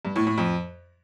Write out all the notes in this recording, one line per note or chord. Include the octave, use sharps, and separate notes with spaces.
G2
A2
A2
F2